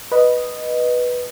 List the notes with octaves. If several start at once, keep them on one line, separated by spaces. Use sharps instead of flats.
B4 D#5